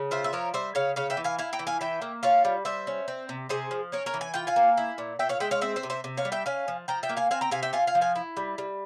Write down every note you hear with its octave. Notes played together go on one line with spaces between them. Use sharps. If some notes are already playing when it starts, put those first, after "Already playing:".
Already playing: C#3
F4 C5 E5
E5
F3 A#4 C#5
G3 C5 E5
C#3 C#5 F5
C#3 C#5 F5
E5 G5
E3
F5 G#5
E4 F5 G#5
G5 A#5
E3
F5 G#5
E3 E5 G5
A#3
F4 C#5 F5
G3
G3 C5 E5
C#4
C4
C3
C3 G#4 C5
F3
C#4 A#4 C#5
A#4 C#5
E3
G#5
F4 G5
F5 G#5
A#3
E4
A#2
A#2 E5 G5
C#5 F5
G#3 E5 G5
C#5 F5
C4 C5 E5
C5 E5
C3
C5 E5
C3
C#5 F5
G3
E5 G5
C#4 F5 G#5
F3
F3 G5 A#5
E5 G5
A#3
F5 G#5
C4 F5 G#5
G5 A#5
C3 F5 G#5
E5 G5
F4 F5 G#5
F5 G#5
F3
F5 G#5
E4
G3
G3